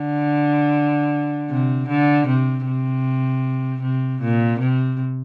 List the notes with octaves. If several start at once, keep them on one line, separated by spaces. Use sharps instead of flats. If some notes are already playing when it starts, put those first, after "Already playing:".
Already playing: D3
C3
D3
C3
C3
C3
A#2
C3